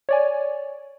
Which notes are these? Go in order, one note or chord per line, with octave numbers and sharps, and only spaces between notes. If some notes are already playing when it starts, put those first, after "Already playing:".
C#5 D5 G#5